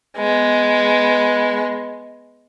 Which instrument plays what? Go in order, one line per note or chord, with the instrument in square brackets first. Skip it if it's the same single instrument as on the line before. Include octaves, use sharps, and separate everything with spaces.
[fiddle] G#3 B3